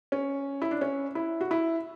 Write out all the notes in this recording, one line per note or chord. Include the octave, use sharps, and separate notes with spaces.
C#4
E4
D4
C#4
E4
F#4
E4